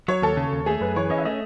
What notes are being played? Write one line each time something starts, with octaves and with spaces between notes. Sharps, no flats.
F#3 C#5
D#2 A4
C#3
D#2
A3 G#4
F#2 B4
E3 C#5
C#4 D#5
E5
A3 D#5